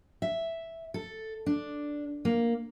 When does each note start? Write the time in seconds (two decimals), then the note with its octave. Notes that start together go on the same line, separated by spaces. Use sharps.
0.22 E5
0.94 A4
1.46 D4
2.25 A#3